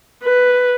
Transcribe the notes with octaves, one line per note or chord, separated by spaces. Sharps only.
B4